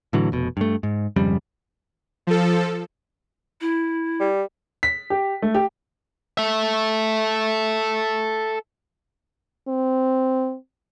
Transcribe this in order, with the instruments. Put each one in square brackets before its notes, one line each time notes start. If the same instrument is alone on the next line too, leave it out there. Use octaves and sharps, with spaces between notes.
[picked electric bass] A2 D3 E3 F#3
F1 B2
G2 A3
G#2
G#1 F2 C#3 G3
[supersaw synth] F3 A4
[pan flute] E4
[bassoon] G3
[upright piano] B6
G4
A3
G4
[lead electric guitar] A4 E5
[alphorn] C4